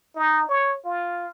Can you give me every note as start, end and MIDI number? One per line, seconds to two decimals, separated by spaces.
0.15 0.46 63
0.48 0.77 73
0.85 1.26 65